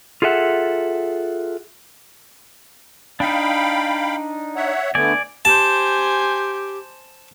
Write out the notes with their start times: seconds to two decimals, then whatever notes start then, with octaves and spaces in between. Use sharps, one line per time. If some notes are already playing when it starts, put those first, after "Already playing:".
0.22 F4 G#4 A4 E5 F#5
3.20 D4 D#4 F5 G5 B5
4.56 C#5 E5 F#5
4.95 D3 A3 B3 D5 G#5
5.45 G4 C5 G#5 A5